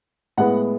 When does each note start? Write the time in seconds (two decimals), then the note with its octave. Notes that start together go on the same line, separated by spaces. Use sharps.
0.37 A2 G#3 B3 F#5